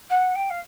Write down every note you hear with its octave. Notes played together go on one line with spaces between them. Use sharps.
F#5
G5
F5